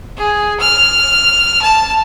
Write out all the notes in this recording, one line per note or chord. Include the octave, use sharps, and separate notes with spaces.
G#4
F6
A5